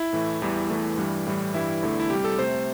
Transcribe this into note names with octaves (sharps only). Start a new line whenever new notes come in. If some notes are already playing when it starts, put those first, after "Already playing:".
Already playing: E4
A2 E3 A3
E2 E3 G3
E2 E3 A3
G2 E3 G3
A2 E3 G3
G2 E3 G3 E4
E2 D3 A3
E4
C3 G3 G4
A4
C3 A3 C5